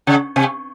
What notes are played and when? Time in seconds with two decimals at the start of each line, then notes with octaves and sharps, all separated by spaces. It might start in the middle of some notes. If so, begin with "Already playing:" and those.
0.07 C#3
0.36 C3